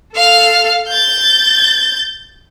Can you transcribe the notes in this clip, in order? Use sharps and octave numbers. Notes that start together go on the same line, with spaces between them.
A4 F5 F6
G6 A6